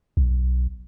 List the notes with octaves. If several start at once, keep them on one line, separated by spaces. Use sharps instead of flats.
B1